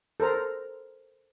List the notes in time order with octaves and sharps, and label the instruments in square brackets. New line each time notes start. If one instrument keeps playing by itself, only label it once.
[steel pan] A4 A#4 C5 A#5